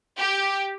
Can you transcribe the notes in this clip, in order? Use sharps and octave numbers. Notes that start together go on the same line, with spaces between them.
G4